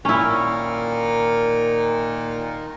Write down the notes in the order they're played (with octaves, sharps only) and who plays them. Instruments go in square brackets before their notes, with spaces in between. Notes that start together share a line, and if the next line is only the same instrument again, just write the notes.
[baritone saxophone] A#2 [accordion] D#3 D#4 A#4 [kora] C#4 E4